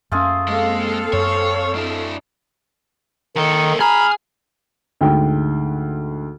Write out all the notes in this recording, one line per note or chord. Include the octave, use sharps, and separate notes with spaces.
F#2 A3 C#4 F4 G#4
G#3 A#3 C4 A4 F5
F#2 C#5
D4 E4
D#2 D#3 A4
G#4 G#5 A#5 B5 F6
D2 G#2 G5